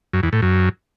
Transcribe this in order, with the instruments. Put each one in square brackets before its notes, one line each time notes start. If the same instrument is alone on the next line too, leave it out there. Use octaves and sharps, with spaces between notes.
[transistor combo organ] F#2
E2
A2
F#2